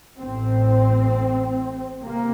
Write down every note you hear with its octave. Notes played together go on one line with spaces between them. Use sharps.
A1 A2 C4
C3 A#3